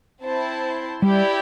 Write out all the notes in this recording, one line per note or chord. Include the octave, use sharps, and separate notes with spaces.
C4 E4 C5 A5
G3 E4 G4 D5 G5